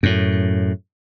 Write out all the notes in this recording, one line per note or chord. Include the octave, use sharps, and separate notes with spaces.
F#2 A2